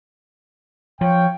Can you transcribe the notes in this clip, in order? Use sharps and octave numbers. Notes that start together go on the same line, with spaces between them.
F3 C#5 F5 G5